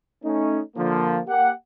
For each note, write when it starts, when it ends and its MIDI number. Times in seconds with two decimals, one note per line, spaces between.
0.24 0.60 57
0.24 0.60 61
0.24 0.60 63
0.76 1.19 50
0.76 1.19 53
0.76 1.19 58
1.27 1.50 58
1.27 1.50 67
1.27 1.50 78